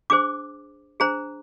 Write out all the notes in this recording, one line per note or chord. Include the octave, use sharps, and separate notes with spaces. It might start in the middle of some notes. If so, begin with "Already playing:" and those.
D4 G#4 C5 D6
D4 G#4 C5 A#5